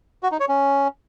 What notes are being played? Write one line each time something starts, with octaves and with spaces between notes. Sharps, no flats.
F#4
D#4
C#5
C#4